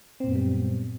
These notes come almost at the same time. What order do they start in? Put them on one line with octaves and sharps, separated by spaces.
C4 A#2 F#2 B3 G3